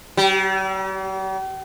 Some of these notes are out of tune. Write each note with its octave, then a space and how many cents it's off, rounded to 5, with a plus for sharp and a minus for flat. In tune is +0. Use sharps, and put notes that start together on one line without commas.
G3 -45